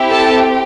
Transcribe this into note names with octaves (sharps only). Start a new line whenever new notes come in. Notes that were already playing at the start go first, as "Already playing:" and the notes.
Already playing: C4 E4 G4
A4 A5